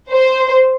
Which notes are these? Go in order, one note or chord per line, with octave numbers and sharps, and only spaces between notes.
C5